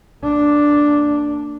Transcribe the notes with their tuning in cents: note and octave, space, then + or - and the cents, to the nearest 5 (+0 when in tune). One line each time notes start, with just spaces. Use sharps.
A#3 -35 D4 +0